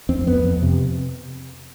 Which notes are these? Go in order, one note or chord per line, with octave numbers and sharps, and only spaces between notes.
F2 C4
F2 B3
F2
C3